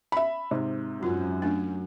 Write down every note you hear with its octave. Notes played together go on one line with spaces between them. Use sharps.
E5 B5
G#2 C3
F#2 F4
A3 D4